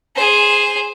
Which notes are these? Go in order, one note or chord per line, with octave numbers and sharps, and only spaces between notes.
G#4 C5